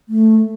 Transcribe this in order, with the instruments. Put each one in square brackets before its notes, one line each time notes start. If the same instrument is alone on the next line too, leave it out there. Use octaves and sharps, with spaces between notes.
[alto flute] A3